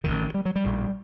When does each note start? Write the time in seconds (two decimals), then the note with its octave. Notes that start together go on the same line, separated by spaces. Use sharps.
0.04 A1 G2 D3 D#3
0.34 G3
0.45 F#3
0.56 G3
0.64 A#1 A2